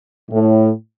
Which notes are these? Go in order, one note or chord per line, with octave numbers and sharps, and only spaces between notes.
A2